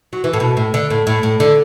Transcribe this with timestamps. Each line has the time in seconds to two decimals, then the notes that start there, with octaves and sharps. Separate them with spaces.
0.13 F#3
0.24 E3
0.33 A2
0.40 B2
0.57 A2
0.74 D3
0.90 A2
1.07 A2
1.23 A2
1.40 D3